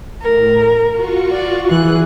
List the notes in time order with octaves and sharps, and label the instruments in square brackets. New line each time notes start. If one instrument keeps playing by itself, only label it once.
[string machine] A2 [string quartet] A#4
[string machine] F4 F#4 C#6
[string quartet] D5
[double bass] E3 [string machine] G#4 [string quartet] F#6